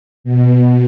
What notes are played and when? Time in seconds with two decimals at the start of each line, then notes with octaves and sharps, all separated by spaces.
0.24 B2